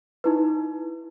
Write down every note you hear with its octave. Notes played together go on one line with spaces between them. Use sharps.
D#4 E4 B4